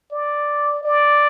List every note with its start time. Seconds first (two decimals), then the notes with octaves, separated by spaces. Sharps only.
0.12 D5
0.83 D5